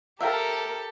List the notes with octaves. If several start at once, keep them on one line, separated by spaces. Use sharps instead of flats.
G4 A4 A#4 E5 F5 G5